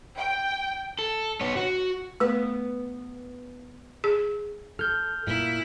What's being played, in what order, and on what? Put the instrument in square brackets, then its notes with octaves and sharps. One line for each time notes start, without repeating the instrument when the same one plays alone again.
[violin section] G5
[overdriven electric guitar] A4
B3 C#5
F#4
[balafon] A3 [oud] B3 B4
[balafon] G#4
[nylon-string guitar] A4 [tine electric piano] F6 G6
[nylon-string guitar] A#2 [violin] E4